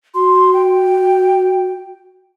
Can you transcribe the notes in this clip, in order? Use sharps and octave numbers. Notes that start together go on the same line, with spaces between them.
F#4 C6
G5